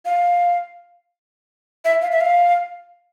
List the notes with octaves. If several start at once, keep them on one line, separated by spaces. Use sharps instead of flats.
F5
E5
F5
E5
F5